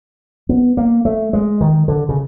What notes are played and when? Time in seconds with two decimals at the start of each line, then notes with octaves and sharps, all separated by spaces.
0.49 B3
0.77 A#3
1.05 A3
1.33 G#3
1.61 D#3
1.88 D3
2.09 C#3